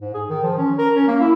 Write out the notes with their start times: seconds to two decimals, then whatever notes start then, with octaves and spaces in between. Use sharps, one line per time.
0.01 G#2
0.14 G#4
0.29 D#3
0.43 F3
0.58 C#4
0.78 A#4
0.95 C#4
1.08 A#3
1.21 E4